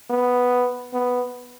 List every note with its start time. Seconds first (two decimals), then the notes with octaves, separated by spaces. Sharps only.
0.10 B3
0.93 B3